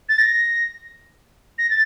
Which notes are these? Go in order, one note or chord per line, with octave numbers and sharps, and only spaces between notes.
A6
A#6
A#6
A6